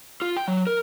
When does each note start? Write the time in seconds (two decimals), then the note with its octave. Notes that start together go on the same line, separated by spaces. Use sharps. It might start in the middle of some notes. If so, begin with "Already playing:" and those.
0.22 F4
0.36 G5
0.48 F#3
0.67 A#4